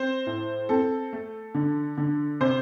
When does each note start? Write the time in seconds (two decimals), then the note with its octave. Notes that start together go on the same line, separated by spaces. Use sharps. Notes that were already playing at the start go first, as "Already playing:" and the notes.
Already playing: C4 C5
0.26 A2
0.69 C4 A4
1.13 A3
1.54 D3
1.97 D3
2.40 C3 C5